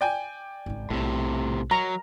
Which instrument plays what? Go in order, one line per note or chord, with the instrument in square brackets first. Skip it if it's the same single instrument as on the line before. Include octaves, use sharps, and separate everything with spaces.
[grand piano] D5 G5 G#5
[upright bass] G#1 C#3
[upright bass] B1 [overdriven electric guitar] A2 C3
[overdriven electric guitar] F#3 [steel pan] A#5